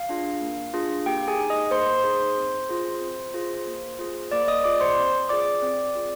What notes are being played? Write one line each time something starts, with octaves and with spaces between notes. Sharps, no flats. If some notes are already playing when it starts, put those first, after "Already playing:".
Already playing: F5
D4 F4 G#4
A#3
D4 F4 G#4
A#3 G4 G5
G#4 G#5
D#4 G#4
D#5 D#6
A#3 C5 C6
D#4 G#4
C4
F4 G#4
C4
F4 G#4
A#3
F4 G#4
A#3 D5 D6
D#5 D#6
F4 G#4 D5 D6
C5 C6
C4
F4 G#4 D5 D6
C4
F4 G#4